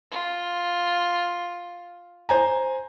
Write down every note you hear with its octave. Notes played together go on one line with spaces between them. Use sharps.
F4
C5 G#5 A#5